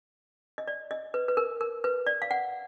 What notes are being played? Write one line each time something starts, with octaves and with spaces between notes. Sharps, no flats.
D#5
D5
D#5
B4
B4
A#4
A#4
B4
D5
F5
F#5